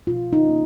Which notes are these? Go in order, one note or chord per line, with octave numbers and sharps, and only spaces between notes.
B2 F4
D#4
A#3 C#4